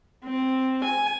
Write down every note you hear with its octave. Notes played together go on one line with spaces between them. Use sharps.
C4
G#5